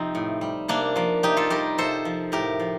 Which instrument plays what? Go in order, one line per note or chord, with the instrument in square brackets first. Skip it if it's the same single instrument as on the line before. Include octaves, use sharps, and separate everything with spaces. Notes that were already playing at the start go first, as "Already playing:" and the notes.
Already playing: [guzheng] C3 F3 C4 D#4
A2
G3
C3 A#3 D4
F3 A#3
C3 D#4 G4
F4 A4
G3 G4 A#4
C3 A4 C5
F3
A2 G4 A#4
F3